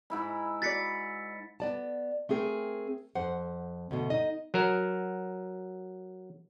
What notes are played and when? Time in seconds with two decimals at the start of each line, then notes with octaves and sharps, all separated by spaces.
0.10 G#2 E4 B5
0.62 F#4 D5 A6 B6 C#7
1.60 B3 D5 A5
2.29 A3 C4 G#4 A#4 G5
3.15 F2 C5 F#5
3.91 D2 B2
4.10 D#4 D#5
4.54 F#3 A#4